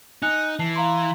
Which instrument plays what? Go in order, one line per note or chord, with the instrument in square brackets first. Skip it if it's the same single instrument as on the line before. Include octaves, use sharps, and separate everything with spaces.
[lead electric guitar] D#4 [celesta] G#5 F#6 C#7
[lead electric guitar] E3 [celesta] A5 C7
[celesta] F5 A#5 C6